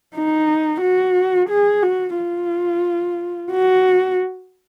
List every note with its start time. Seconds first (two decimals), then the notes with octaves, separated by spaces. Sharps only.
0.16 D#4
0.82 F#4
1.49 G#4
1.83 F#4
2.18 F4
3.52 F#4